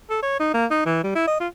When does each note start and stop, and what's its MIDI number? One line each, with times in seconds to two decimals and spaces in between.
0.10 0.20 69
0.23 0.37 73
0.40 0.50 63
0.54 0.66 58
0.70 0.84 63
0.86 1.03 52
1.04 1.11 55
1.15 1.27 64
1.27 1.36 75
1.40 1.48 65